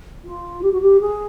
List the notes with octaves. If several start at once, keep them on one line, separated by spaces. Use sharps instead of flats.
F4
G4
F#4
G4
G#4